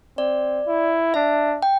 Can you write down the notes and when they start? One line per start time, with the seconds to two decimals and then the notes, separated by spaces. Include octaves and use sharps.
0.18 C4 D5
0.67 E4
1.14 D4 E5
1.62 G5